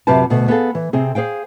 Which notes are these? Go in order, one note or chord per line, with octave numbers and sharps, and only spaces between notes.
F#2 C3 F4 G4 B4 A5
D2 B2 A3 B3
B3 G#4 A4 F5
E3
C3 C4 G#4
G#4 C5 F5 G5